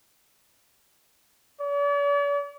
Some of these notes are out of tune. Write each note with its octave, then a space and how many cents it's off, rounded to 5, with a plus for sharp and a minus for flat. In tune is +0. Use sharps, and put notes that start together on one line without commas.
D5 -45